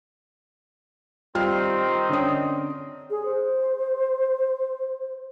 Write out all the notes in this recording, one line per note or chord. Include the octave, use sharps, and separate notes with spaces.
D#3 G3 C4 F4 F6
D3 C#4 D#6
G#4
C5